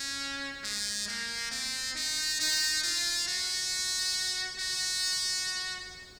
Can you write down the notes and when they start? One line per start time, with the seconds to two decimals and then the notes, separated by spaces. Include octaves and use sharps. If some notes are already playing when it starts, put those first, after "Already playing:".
Already playing: C#4
0.64 G#3
1.08 A#3
1.51 C4
1.96 D#4
2.40 D#4
2.83 F4
3.28 F#4
4.59 F#4